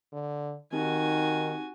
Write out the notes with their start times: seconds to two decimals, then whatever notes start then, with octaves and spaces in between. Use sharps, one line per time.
0.13 D3
0.73 D#3 C4 D#4 F#4 G4 G#5